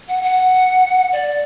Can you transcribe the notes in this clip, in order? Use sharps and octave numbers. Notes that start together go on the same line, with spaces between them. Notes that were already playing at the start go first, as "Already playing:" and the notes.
F#5
F#5
D5